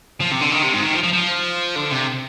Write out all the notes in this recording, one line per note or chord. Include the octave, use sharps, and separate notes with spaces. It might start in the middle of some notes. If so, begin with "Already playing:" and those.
F3
C3
D3
D#3
C3
G#2
D#3
F3
F3
F3
D3
C3